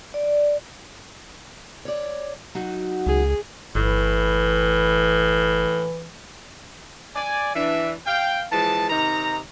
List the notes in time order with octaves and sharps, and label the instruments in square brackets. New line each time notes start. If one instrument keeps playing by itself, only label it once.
[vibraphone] D5
[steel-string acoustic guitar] C#5 D5
F#3 D#4 F#4
[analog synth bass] C#2 [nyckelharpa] G#4
[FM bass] G1 [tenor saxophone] A2 [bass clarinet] E3
[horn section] D5 G#5
E3 D4 E5
F5 G5
E3 F3 G#3 A5
C3 D#3 D#4 A#5